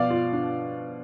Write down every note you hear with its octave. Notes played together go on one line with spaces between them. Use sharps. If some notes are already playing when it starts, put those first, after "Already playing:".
Already playing: B2 F3 D5 F5
F4
D4